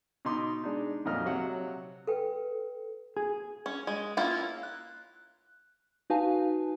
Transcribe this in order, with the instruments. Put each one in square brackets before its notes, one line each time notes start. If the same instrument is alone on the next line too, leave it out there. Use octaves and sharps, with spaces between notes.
[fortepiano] B2 D#4 C6 D6
G#3 D4 D#4
F2 A#2 F#3 D#5 F6
C3 F#3 F#5
[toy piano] A4 B4 G5
[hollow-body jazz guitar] G#4
[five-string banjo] C#4
G#3
A#3 C#4 E4 F4
[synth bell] F#6
D#4 F#4 B4 F5 G#5 A5